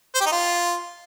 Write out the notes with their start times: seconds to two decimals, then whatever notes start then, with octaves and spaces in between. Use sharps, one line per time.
0.15 C5
0.21 G4
0.27 D#4
0.32 F4